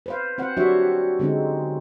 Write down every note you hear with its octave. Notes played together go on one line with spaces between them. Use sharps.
B4 C5 F5
C4 C5 F#5
F#3 D4 F#4 G4 C#5 E5
D3 G#3 C4 C#4 D#4